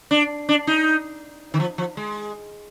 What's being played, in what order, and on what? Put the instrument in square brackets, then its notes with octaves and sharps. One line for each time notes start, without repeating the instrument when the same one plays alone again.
[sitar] D4
D4
D#4
D#3
F3
F3
G#3